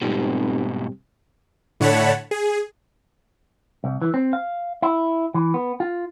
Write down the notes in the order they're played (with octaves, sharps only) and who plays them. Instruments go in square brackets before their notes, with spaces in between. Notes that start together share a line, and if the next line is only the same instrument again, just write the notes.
[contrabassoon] F1 [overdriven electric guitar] G#2 B2 [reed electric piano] G3 C4 G4
[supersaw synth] A2 D3 C#5 F#5 A5 B5
G#4
[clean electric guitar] C2
E3
C4
F5
E4
E3
B3
F4